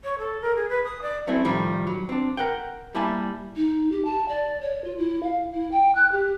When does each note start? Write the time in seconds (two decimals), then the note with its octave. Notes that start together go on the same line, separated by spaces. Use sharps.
0.04 C#5
0.19 A4
0.42 A#4
0.56 G#4
0.69 B4
0.84 D#6
1.02 D5
1.27 F#3 A3 C4 C#4 E4
1.45 A2 D#3 F3 G3
1.87 F#3
2.09 C4 D4
2.37 A#4 F#5 G5
2.95 G3 A#3 E4 E5 G#5 A5
3.56 D#4
3.92 G4
4.05 A5
4.29 D5
4.61 C#5
4.84 F4
4.98 E4
5.23 F5
5.53 E4
5.72 G5
5.95 F#6
6.12 G4